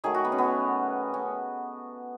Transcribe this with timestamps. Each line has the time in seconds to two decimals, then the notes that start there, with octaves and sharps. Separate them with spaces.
0.04 D#3 F#3 A3 G#4
0.14 F#4
0.25 B3
0.32 C#4
0.38 B3
1.14 C#4